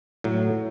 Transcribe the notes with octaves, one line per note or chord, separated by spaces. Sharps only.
A2 F#3